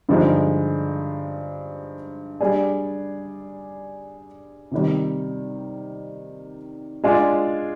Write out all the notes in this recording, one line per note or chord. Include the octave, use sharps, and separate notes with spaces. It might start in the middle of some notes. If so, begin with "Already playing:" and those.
G2 D3 F3 G#3 D#4
G3 D4 G#4 D5
C3 D#3 G3
G#3 D4 F4 G#4 D5